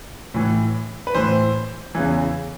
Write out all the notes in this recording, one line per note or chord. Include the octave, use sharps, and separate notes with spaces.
A2 E3
B4
A2 E3 C5
E2 C#3 E3